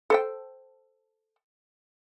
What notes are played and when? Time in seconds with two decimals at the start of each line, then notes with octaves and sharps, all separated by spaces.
0.10 A4 C5 G5